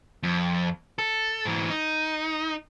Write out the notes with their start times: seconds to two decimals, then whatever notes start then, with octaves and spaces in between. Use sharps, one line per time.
0.23 F2
0.98 A4
1.46 G#2 E3
1.70 D#4